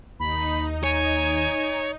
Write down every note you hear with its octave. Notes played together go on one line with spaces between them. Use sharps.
D#2 D#4 B5
C#5 G#5